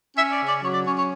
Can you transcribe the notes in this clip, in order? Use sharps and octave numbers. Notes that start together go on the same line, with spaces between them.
C#4 E5
D5
C#3
D5
F#3 C#5
D5
C#4 C#5
C#5